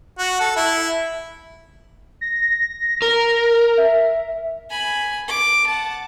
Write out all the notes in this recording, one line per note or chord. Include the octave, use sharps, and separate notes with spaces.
F#4
A4
E4
A#6
A#4
E5
G#5 B5
D6
F#5 A5